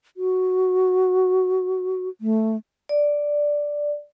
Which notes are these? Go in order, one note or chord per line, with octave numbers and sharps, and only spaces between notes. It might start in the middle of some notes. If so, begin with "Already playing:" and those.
F#4
A3
D5